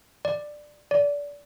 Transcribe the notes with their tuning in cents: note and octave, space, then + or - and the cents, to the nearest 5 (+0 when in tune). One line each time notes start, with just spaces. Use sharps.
D5 +10
D5 -25